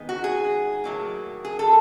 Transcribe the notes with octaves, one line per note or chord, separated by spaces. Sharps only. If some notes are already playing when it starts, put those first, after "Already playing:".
Already playing: D#3 G#3 B3 D#4
F#4
G#4
A2 F#3 A#3
G#4
A4